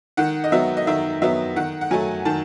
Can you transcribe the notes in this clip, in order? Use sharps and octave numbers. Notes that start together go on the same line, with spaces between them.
D#3 F#5
D#5
F#3 B3 E5
D#5
D#3 E5
F#3 B3 E5
D#3 F#5
F#5
F#3 A3 G#5
D#3 A5